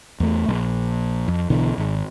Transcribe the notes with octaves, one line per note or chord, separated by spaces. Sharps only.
E2 A3
A#1
F2
B1 B2 D3 E3
G#1